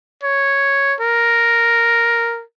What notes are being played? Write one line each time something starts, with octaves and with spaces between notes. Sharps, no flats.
C#5
A#4